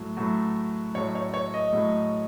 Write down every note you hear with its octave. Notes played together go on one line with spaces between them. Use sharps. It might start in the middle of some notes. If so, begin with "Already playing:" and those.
Already playing: A2 F#3 A3
A2 F#3 A3
A2 F#3 A3 C#5
C#5
C#5
D#5
A2 F#3 A3